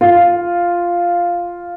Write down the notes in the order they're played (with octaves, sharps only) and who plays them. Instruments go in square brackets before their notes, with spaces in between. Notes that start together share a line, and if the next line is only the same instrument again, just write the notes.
[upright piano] F4